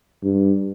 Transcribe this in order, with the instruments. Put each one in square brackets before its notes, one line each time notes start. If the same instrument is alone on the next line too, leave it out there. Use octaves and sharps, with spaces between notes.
[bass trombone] G2